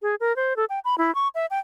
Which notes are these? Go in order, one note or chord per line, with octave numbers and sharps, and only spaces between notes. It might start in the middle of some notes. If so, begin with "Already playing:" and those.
G#4
A#4
C5
A4
G5
B5
E4
C#6
E5
G5